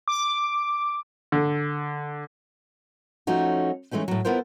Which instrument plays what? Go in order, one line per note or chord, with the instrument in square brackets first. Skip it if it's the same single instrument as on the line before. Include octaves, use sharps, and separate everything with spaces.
[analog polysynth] D6
[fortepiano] D3
[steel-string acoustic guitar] F3 A3 C#4 D#4 F#4
E3 G#3 A3 C#4 D#4
A2 F#3
B3 E4 F4 A#4 C5